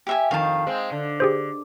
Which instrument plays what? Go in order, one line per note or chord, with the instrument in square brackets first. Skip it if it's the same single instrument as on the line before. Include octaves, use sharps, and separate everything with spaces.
[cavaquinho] G4 E5 G#5
[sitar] F2 D#3 [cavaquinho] F5 A5
[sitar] G#3 C4
D3
[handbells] G4 G#4 C5